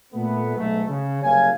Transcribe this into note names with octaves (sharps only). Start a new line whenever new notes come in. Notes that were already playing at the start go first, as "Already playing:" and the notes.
A#2 A3 B3
B1 G#2 A3
C#3
F#1 C2 C#5 F5 G#5